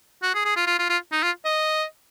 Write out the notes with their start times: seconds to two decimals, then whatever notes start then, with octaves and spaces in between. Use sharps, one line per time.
0.23 F#4
0.34 G#4
0.45 G#4
0.56 F4
0.67 F4
0.79 F4
0.89 F4
1.12 D#4
1.23 F4
1.45 D#5